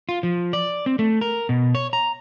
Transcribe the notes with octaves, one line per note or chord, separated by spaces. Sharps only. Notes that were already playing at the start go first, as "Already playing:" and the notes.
F4
F3
D5
C4
A3
A#4
B2
C#5
A#5